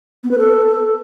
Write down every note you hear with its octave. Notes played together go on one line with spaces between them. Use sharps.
B3
B4
A4